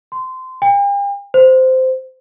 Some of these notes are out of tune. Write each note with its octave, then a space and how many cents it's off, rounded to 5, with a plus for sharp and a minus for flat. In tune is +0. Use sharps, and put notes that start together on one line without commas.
C6 -20
G5 +45
C5 -15